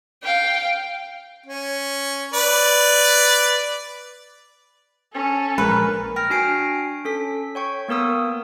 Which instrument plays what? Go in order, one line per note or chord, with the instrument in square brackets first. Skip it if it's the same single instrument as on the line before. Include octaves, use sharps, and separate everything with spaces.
[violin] F5 G5
[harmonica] C#4
B4 D5
[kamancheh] C#4 A4
[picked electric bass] A#1 G#3 [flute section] A#4 [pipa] B4
[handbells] G5 F6 A#6
D4 F#4 G#5 C7 D7
C#4 A4 B6
C#5 G5 C#6
A#3 B3 A#4 D#6 E6